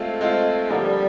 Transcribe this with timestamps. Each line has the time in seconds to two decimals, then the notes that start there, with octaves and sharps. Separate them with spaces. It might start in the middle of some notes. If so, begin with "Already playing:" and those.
Already playing: G#3 A3 C4 F4
0.21 G#3 C4 F4
0.70 D3 F3 G3 A#3